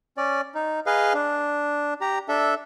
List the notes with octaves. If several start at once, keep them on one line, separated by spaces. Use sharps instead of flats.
C#4 D5
D#4
G#4 B4 D#5 F5
D4
G4 A#5
D4 A4 E5